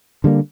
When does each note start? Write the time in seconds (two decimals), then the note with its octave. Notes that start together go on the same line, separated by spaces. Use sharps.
0.24 D3 G3 A#3